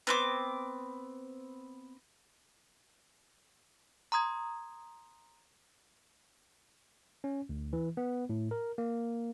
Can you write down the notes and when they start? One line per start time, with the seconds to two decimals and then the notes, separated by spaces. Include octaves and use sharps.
0.07 B3 C4 D6
4.12 A#5 C6 D#6 G#6
7.24 C#4
7.49 D2
7.73 E3
7.97 B3
8.29 A2
8.51 A#4
8.78 A#3